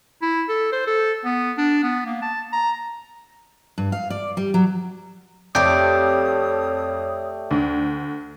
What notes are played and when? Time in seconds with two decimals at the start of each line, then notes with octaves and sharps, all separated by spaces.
0.22 E4
0.49 A4
0.72 C5
0.87 A4
1.25 B3
1.58 D4
1.83 B3
2.06 A#3
2.22 A5
2.53 A#5
3.78 G2
3.92 F5
4.10 D5
4.37 G3
4.54 F#3
5.55 F2 A3 G4 C#5 D5 G5 D#6
7.51 D2